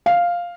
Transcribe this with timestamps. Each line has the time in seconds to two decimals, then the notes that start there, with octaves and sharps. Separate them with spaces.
0.06 F5